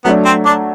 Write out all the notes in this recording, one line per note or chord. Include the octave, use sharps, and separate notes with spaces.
F#3 A3 B3 D4
C4
D4